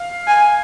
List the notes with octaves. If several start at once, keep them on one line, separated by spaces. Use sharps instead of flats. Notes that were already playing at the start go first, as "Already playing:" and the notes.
Already playing: F5
G#5